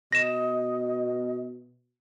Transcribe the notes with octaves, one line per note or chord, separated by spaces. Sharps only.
B2 D#5 A#6 E7